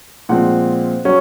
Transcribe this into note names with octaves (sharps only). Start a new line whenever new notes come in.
A#2 F3 G#3 C4 F#5
F#3 C#4